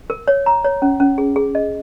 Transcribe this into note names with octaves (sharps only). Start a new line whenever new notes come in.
A#4
C#5
A#5
C#5
C#4
C#4
G#4
G#4
D#5